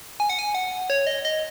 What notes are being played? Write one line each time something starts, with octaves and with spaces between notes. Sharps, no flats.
G#5
F#5
G#5
F#5
C#5
D#5
D#5